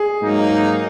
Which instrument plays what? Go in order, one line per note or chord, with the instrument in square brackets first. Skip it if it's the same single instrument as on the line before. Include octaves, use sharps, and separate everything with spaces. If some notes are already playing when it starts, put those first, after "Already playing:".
Already playing: [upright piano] G#4
[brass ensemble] G#2 F#3 A#3 D#4